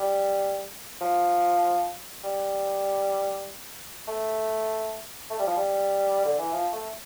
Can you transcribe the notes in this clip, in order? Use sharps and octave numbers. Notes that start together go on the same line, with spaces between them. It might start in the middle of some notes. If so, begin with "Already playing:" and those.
Already playing: G3
F3
G3
A3
A3
G3
F3
G3
D3
E3
F3
A3